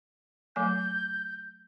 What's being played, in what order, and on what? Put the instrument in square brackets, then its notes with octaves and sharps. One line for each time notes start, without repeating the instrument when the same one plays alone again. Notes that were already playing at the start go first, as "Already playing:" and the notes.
[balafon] F#3 A3 G#5 [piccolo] G6